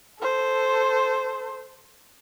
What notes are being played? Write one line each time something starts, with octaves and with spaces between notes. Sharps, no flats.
A4 C5